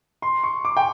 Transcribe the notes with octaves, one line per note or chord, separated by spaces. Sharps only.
C6
C#6
D6
G5